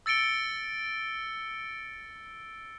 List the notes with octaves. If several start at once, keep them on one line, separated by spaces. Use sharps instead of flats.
E6 A6 C#7 D7 G7